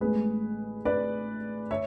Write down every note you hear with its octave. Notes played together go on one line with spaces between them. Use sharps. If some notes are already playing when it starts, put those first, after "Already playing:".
A1 A2 G#3 B3 G#4 B4
B4 D5
C#5 E5